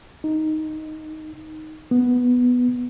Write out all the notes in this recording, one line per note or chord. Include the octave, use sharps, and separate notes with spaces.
D#4
B3